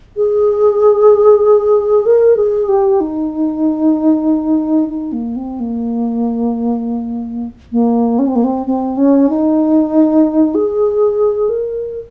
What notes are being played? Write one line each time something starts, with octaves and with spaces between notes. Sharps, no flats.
G#4
A#4
G#4
G4
D#4
D#4
A#3
C4
A#3
A#3
C#4
C4
A#3
C4
C4
C#4
D#4
G#4
A#4